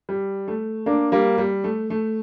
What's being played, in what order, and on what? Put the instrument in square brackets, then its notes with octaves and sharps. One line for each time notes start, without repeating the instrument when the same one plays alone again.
[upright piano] G3
A3
A#3 D4
G3 A#3
G3
A3
A3